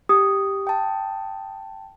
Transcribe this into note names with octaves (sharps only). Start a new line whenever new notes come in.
G4 D#6
G5 A5